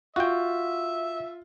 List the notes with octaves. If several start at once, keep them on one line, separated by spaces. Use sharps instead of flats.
F4 F#4 E5 G5